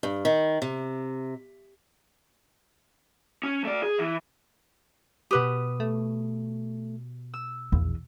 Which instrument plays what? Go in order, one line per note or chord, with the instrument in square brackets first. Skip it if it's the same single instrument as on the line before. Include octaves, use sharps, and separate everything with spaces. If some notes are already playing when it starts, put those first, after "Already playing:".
[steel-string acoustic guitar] G2
D#3
C3
[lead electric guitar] C#4
A3 D5
G#4
E3
[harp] B2 D#6 [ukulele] G4 B4
[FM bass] A3
[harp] E6
[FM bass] A#1 [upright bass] E2